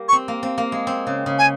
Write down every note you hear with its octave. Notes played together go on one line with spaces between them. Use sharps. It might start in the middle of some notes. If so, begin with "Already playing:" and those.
Already playing: G3 A#3
C#6
C4
A#3
C4
A#3
G#3
C4
C#3
C#3
G#5